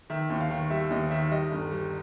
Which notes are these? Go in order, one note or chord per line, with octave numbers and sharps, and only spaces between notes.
D#3 E5
D#2
F5
D#3
G3 E5
D#2 D#5
D#3 E5
G3 D#5
G1
G3